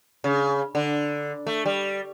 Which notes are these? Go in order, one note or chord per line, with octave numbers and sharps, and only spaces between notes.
C#3
D3
A3
G3